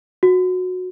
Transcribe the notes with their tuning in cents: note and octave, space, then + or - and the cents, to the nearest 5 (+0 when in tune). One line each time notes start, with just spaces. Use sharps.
F#4 -15